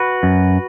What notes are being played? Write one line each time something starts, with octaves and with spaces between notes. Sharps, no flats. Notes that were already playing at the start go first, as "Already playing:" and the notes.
Already playing: F#4 B4
F#2